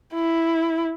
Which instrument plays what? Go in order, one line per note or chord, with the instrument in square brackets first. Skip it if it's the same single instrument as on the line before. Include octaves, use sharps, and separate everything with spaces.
[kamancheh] E4